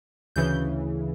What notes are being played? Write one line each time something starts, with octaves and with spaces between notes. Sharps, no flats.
D2 C#3 E3 G6